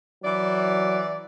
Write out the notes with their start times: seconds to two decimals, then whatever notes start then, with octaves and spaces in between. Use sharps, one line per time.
0.24 E3 F#3 D5